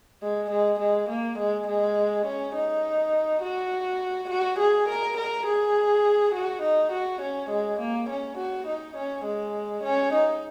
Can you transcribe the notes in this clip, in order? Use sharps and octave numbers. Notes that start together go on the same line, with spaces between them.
G#3
G#3
G#3
A#3
G#3
G#3
C#4
D#4
F#4
F#4
G#4
A#4
A#4
G#4
F#4
D#4
F#4
C#4
G#3
A#3
C#4
F#4
D#4
C#4
G#3
C#4
D#4